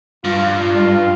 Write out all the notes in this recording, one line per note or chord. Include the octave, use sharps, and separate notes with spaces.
G2 F4